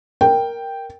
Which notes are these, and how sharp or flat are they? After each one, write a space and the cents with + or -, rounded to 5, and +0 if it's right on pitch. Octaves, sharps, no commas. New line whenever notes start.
A#4 +0 G5 +0